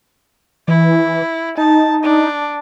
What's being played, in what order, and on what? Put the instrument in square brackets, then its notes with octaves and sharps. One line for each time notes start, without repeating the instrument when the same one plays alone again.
[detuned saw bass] E3 [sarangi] E4
[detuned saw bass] D#4 [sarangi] A5
[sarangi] D4